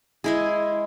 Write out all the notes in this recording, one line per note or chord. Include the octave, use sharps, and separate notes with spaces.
G#3 E4 G#4